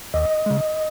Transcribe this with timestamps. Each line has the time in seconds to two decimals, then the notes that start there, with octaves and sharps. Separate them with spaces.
0.14 D#2 D#5
0.46 C#3 G#3